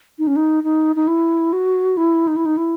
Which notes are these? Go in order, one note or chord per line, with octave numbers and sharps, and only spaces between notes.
D#4
C#4
D#4
D#4
D#4
E4
F#4
E4
D#4
E4
D#4
E4